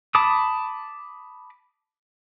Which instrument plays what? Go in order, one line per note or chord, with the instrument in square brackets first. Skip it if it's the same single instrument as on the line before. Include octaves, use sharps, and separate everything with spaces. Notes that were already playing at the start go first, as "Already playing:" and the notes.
[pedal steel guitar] A5 B5 D6 D#6